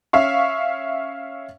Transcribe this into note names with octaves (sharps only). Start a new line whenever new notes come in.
C#4 E5 F5 C#6